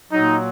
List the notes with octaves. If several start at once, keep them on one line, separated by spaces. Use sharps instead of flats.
A#2 F#3 D#4